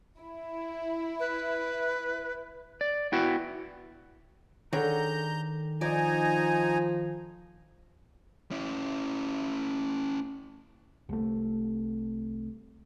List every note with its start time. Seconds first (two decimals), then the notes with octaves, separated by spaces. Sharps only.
0.19 E4
1.19 B4
2.81 D5
3.13 B3 E4 F#4 G5
4.73 D3 D#3 G#4 C#5 A#5 G6
5.81 F3 D#4 D5 G#5 A#5
8.51 C#4 E4
11.09 C2 A3